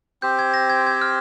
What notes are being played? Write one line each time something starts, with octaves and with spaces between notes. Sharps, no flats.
C4 G4 C5 G6
G#6
A#6
G#6
G#6
F6